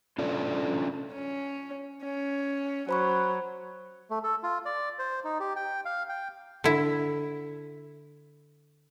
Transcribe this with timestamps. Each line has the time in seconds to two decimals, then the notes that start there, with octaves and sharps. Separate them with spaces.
0.18 C#4 D4 F4 A4 D5
1.13 C#4
2.03 C#4
2.89 F#3 C5 B5 C#6
4.10 A3
4.24 A4
4.43 F4
4.66 D5
4.99 C5
5.25 D#4
5.40 G4
5.56 G5
5.85 F5
6.09 G5
6.64 D3 E4